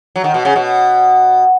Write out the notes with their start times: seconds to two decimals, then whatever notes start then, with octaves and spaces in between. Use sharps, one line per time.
0.16 F#3
0.24 D#3
0.34 B2
0.45 C#3
0.56 B2